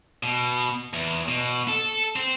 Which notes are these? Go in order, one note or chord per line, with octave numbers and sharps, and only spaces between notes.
B2
E2
B2
A4
C4